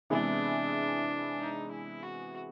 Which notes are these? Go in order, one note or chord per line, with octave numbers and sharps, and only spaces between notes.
C3 E3 G#3 B3 D4 E4
D#4
E4
F#4